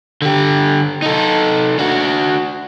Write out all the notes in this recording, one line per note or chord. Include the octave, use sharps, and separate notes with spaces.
D3 G4
D#4 A4
D4 F#4